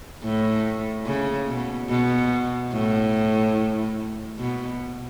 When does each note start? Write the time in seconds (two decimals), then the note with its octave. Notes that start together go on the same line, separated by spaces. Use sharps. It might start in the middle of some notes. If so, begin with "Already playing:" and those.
0.24 A2
1.06 C#3
1.48 B2
1.90 B2
2.72 A2
4.39 B2